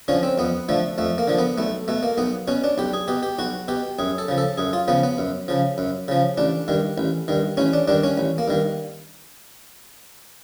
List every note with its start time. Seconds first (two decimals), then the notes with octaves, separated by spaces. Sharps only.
0.08 D3 F3 C#4
0.23 C4
0.38 F2 B3
0.69 D3 F3 A3
0.98 F2 A3
1.18 A#3
1.28 D3 F3
1.39 B3
1.58 B1 A3
1.88 B2 A3
2.03 A#3
2.18 B1 B3
2.48 B2 C#4
2.64 D4
2.78 B1 G4
2.93 G#4
3.08 B2 G4
3.23 G4
3.39 B1 F#4
3.68 B2 G4
3.99 F#2 G#4
4.18 A4
4.28 C#3 F3
4.38 A4
4.57 F#2 G#4
4.73 F4
4.88 C#3 F3 B3
5.03 B3
5.18 F#2
5.48 C#3 F3
5.78 F#2
6.08 C#3 F3
6.37 A1 D4
6.68 G2 D#3
6.98 A1
7.28 G2 D#3
7.57 A1 C#4
7.73 D4
7.88 G2 D#3 D4
8.04 C#4
8.17 A1
8.38 A#3
8.48 G2 D#3